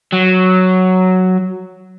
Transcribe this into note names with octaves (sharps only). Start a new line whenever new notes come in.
F#3